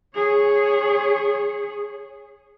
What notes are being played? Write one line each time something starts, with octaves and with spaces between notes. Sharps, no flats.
G#4 C#5